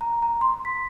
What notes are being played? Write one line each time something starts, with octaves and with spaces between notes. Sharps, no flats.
A#5
A#5
C6
B6